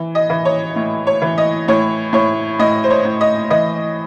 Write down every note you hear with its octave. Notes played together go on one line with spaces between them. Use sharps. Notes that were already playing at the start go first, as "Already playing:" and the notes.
Already playing: E3
D#5
E3
C#5
A2
C#5
E3
D#5
A2 C#5
A2 C#5
A2 D#5
C5
C#5
A2
D#5
E3 D#5